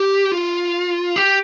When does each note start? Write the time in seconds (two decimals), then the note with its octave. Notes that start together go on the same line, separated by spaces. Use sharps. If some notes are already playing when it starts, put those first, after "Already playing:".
Already playing: G4
0.32 F4
1.16 G4